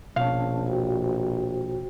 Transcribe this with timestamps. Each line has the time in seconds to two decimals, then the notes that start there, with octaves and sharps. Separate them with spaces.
0.16 A#1 B2 C#4 C#5 F5 A5
0.67 F#4 C5 G5